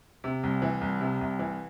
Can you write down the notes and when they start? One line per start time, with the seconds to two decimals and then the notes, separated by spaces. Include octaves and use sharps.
0.24 C3
0.43 C2
0.62 E3
0.81 C2
1.01 C3
1.21 C2
1.39 E3